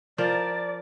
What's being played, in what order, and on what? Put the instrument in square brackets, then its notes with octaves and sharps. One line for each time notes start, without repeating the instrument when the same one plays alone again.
[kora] F3 A#4 [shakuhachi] D5